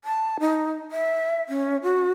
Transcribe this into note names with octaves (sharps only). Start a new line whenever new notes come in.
A5
D#4
E5
C#4
F#4